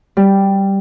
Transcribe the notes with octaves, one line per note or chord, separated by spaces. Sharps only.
G3